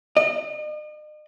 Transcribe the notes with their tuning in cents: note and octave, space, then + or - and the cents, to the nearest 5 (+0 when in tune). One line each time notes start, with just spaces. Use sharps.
D#5 -45